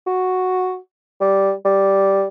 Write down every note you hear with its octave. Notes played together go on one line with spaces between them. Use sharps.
F#4
G3
G3